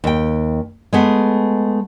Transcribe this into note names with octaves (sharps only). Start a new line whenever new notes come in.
D#2 G5
G#3 A3 B3